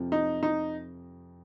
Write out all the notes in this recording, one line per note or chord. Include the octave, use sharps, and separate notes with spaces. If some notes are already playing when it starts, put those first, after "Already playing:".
Already playing: F2 C3 F3
D#4
D#4